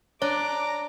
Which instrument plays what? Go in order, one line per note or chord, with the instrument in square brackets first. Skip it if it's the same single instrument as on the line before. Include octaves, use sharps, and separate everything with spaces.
[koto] D4 [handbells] C#5 [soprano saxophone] A#5 [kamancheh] D6